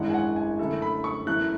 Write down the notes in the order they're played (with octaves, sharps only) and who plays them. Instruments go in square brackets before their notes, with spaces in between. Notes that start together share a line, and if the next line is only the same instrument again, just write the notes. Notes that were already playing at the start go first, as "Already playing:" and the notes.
Already playing: [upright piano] G#1 F#2 E3 G#3 D4 [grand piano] F#5
[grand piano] G#5
F#5
G#5
[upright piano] F#2 D3 A3 E4 A4
[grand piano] B5
C#6
[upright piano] F#2 E3 A3 [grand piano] F#6